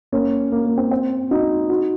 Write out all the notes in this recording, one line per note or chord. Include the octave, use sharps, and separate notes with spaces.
A#3 C#4
A#3
A#3
C4
C4
D#4 F#4
D#4 F#4